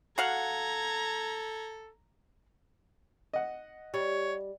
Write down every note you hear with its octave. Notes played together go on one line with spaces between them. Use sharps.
F#4 A4 F5 F#5 A#5 G#6
D#5 F#5
G3 C#5